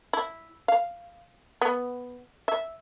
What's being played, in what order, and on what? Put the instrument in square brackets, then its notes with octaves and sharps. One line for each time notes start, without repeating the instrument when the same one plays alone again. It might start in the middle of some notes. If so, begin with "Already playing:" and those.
[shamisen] E4
F5
B3
E5